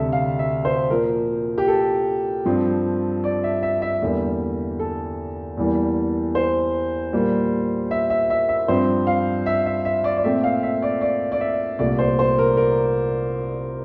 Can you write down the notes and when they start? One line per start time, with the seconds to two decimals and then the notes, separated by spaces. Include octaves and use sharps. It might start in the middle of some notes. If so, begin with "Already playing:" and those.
Already playing: D2 C3 G3 A4 E5
0.12 F5
0.39 E5
0.65 C5
0.90 A#2 F3 A#3 A#4
1.58 G4
1.68 A4
2.45 G2 F3 C4
3.24 D5
3.44 E5
3.63 E5
3.82 E5
4.02 E2 D3 G3 A#3
4.79 A4
5.57 E2 E3 G3 A#3
6.35 C5
7.13 A#2 G3 A#3
7.91 E5
8.10 E5
8.30 E5
8.49 E5
8.68 G2 F3 C4 C5
9.07 F5
9.46 E5
9.66 E5
9.85 E5
10.04 D5
10.17 D5
10.24 A#2 A3 C4 E5
10.44 F5
10.63 E5
10.82 D5
11.01 D5
11.32 D5
11.41 E5
11.79 C2 A#2 A3 D5
11.99 C5
12.19 C5
12.38 A#4
12.57 A#4